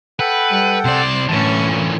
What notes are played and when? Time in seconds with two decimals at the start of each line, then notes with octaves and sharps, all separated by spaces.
0.20 A4 B4 F#5 G5
0.50 G3
0.85 C3 C5 D5
1.29 A2 D3 E3 C#4 A5
1.65 A#2